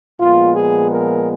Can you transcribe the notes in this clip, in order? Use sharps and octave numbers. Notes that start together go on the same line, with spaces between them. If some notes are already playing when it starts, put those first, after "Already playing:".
A#2 F3 G#3 B3 F4
G#4
A#4